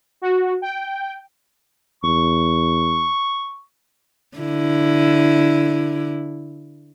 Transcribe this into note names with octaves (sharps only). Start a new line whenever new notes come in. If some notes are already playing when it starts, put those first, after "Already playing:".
F#4
G5
E2 C#6
D3 E4